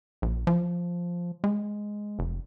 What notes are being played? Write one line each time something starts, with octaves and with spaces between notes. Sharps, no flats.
A#1
F3
G#3
F1